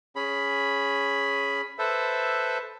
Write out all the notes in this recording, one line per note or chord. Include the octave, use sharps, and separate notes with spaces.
C#4 G#4 B5
A4 B4 C5 E5